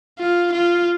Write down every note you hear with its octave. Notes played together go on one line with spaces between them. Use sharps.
F4
F4